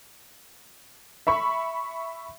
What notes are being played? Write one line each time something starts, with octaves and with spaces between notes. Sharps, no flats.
E5 B5 C#6